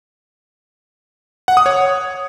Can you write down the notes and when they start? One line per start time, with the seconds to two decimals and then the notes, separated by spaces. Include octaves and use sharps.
1.48 F#5
1.57 D#6
1.66 C#5